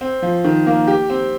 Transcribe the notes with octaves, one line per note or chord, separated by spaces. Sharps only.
C4
F3
D#3
A#3
G4
C4